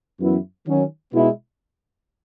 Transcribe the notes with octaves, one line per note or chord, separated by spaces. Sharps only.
F#2 E3 B3 E4
D#3 F#3 C#4
B2 G#3 B3 E4